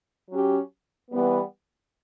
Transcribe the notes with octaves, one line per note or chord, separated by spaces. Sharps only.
F#3 C#4 G4
E3 G3 B3